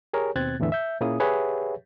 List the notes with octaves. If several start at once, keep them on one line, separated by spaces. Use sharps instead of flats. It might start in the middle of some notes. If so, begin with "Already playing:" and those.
G4 G#4 A#4 C#5
D#2 B2 C4 F#6 G#6 A6
E2 A2 D3 E3 E5
E5 G6
A#2 A#3 C#4 E4 G#4 D#6
G4 G#4 B4 C#5 E5 F#5